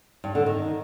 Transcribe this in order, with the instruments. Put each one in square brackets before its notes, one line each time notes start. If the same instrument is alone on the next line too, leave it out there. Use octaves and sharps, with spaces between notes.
[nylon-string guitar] G2
D3
D#3